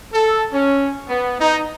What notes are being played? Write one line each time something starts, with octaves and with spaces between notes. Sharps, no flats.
A4
C#4
B3
D#4